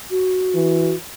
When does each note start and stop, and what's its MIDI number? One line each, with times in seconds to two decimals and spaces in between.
0.11 0.94 66
0.55 0.94 52